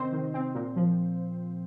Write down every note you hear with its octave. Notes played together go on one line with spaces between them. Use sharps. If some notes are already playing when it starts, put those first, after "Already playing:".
Already playing: C3 D#3 C4 C5 D#5
D#3
C4
A#2
F3